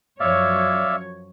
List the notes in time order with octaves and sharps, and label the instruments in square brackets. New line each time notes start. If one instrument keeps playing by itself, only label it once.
[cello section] F#2 F3 C#5 [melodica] D5 E5 F5